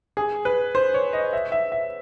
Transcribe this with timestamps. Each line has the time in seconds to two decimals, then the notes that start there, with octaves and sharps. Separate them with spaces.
0.17 G#4
0.45 B4
0.75 C5
0.94 C#5
1.13 D#5
1.33 E5
1.52 E5
1.72 E5